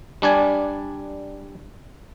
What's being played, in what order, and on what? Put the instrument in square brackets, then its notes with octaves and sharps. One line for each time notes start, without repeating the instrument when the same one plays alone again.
[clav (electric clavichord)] G3 D4 D5 G#5